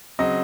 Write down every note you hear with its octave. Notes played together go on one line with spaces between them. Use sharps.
C#3 F#3 C4 D#5